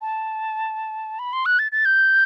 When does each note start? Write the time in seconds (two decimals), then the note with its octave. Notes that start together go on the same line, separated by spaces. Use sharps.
0.01 A5
1.19 B5
1.33 C6
1.46 F#6
1.59 A6
1.72 A6
1.85 G6